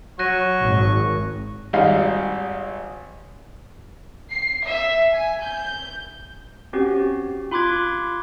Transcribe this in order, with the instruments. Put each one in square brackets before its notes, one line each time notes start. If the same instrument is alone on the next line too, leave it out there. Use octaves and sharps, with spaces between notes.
[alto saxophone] F#3 [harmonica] C#6 [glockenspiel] F#6 A#6 D#7
[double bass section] G#1
[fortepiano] G#1 G3 D#4 F5
[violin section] C7
E5
G#5
G6
[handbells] C4 C#4 F#4 G4
F4 B5 C6 D6 F#6 G#6